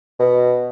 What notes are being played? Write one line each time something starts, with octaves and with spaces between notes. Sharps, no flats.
B2